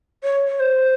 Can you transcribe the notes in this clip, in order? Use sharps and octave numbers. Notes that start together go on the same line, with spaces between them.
C#5
C#5
C5